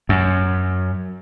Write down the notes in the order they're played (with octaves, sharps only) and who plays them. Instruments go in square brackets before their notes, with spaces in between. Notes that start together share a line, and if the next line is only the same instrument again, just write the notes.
[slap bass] F#2